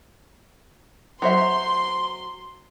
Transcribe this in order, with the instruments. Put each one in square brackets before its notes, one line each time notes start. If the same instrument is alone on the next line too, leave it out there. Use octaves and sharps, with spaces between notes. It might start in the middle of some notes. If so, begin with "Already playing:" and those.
[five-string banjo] F#3 C5 E5 [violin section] C6